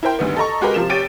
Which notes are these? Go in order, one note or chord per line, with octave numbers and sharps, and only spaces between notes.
E4 A#4 C5 G5
D2 G2 D#3 B3
A4 D#5 A#5 C#6
G#3 F#4 G4 A#4 B4 D#5
C3 F3 E7
F1 G4 C#5 A6 D7 D#7